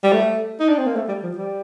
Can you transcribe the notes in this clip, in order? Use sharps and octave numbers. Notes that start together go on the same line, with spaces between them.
G3
A3
D#4
D4
C4
A#3
A3
G3
F3
G3